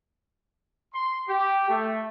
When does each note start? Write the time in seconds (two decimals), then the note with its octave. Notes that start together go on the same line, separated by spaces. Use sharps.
0.93 C6
1.28 G4
1.69 A3